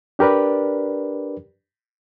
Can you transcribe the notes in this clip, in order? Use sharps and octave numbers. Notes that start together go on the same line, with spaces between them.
D4 G4 A#4 B4 D5